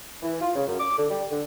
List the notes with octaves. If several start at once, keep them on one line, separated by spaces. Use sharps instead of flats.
E3
F4
C#3
F#2
D6
D3
G3
D3